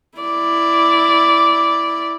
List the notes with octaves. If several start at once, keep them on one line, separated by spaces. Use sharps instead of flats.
E4 D5